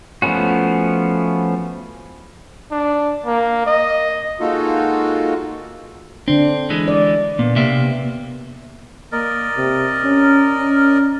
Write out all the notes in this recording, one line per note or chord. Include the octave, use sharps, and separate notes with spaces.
F3 A3 B3 C#4 F#4
D4
A#3
D#5
G#3 A#3 D#4 F4 F#4 A4
D3 C4 D4
E3 G#3
D5
A#2 B3
C3 A#3 E5
A#3 A#4 D5 D#5
C3
C#4
C#4